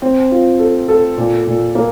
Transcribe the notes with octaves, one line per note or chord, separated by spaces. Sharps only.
C4
F4
A4
A4
A#2
A#2
A#3